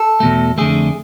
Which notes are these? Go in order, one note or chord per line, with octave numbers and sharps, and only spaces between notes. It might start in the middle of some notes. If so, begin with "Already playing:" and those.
Already playing: A4
E2 B2 A3
F2 D3 A3 G#4